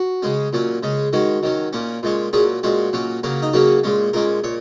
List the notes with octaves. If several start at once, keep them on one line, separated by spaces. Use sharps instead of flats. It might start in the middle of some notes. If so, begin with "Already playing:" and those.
Already playing: F#4
C#3 G#3 C#4
A#2 F#3 C#4
C#3 G#3 C#4
D#3 G#3 C#4 F#4
D#3 F#3 C#4
A#2 A#3 C#4
A#2 G#3 C#4
A#2 F#3 C#4 G#4
A#2 G#3 C#4 F#4
A#2 F#3 C#4
C#3 F#3 A#3 C#4
D#4
C#3 F#3 A#3 C#4 F#4
A#2 G#3 C#4
A#2 G#3 C#4 A#4
A#2 C#5